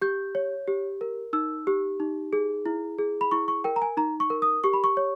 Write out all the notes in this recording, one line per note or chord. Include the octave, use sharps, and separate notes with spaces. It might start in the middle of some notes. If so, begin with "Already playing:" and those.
G4 G6
C#5
G4
A#4
D#4 E6
G4
D#4
G#4
E4
G#4
B5
E4 C#6
C#6
A#4 G5
A#5
G#5
D#4 A#5
C#6
A#4
D#6
G4 C#6
B5
C#6
C#5